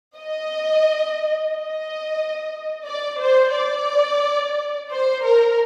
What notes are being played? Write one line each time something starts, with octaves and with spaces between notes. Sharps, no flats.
D#5
D#5
D5
C5
D5
C5
A#4